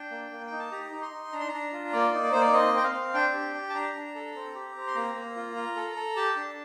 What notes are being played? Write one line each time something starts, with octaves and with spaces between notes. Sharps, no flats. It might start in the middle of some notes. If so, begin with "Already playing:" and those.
Already playing: D4 G5
A#3
A#3
D#4 G5
A5
G4 A#5
D#4
C6
D#4
D4 A#5
C6
D4 A#5
F4
A#3 D5
D#4
D5
A#3 C5
D5
C4 D#5
C4 G5
F5
C4
D4 G5
G4
G4
A5
D4 A#5
D4
A4
C4
G4
C4
C6
A#3 A#5
A#3
F4
F4
A4
A4
G4 A5
D4